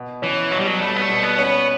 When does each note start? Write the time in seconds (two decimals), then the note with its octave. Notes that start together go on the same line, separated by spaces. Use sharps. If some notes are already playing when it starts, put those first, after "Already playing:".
Already playing: B2
0.22 E3 C#4
0.51 B2 F#3
0.59 G3
0.67 F#3
0.80 G3 A3
0.96 B3
1.02 A3
1.09 B2
1.23 B3
1.38 C#4
1.45 B3